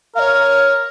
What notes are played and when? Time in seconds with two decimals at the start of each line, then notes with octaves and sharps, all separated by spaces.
0.15 A#4 C#5 F5